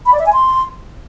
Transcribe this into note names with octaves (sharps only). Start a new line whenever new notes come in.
B5
D5
E5
G#5
C6